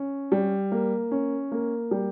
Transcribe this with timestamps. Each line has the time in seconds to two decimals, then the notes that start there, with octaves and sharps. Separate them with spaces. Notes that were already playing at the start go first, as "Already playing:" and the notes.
Already playing: C#4
0.32 G3
0.72 A#3
1.11 C#4
1.52 A#3
1.91 G3